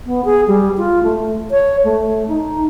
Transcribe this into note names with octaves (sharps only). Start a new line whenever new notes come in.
B3
G#4
G3
F4
A3
C#5
A3
D#4